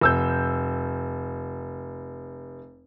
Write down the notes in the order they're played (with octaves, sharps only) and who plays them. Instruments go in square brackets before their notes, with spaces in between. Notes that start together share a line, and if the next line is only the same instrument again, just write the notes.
[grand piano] F1 E6 G6